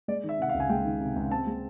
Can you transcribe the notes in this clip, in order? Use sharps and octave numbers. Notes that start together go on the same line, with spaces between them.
G#3 D5
D#3
E5
C3 F#5
F5
C#2
G#5
G#3 G5
D#3
C3
C#2
C4 A5
G#3